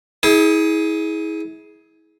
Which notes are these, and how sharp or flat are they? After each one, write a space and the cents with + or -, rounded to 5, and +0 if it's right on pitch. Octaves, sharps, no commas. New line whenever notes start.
E4 -35 G#4 +10